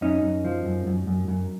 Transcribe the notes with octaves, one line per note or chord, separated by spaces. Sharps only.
F#2 C#4 D#4
F#2
F3
F#2
F#2
F#2
F#2